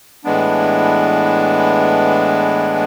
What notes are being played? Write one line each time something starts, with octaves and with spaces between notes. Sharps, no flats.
A2 E3 G#3 B3 D4